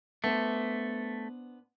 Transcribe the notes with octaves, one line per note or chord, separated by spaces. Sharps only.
A3 B3 D4 C5